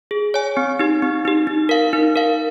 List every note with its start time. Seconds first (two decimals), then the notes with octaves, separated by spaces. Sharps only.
0.11 G#4
0.34 C#5 G#5
0.57 C4
0.79 D#4 G4
1.02 C4
1.25 D#4 G4
1.47 D#4
1.69 A#4 F5
1.93 D#4
2.16 A#4 F5